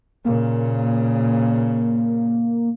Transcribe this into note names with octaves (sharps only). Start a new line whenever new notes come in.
A#2 C#3 A#3